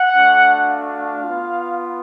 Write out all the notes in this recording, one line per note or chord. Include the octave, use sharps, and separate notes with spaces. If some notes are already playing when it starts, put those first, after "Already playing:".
Already playing: F#5
A3 D4 F#4
F5
B3 F4